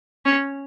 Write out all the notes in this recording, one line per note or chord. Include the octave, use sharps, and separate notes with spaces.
C#4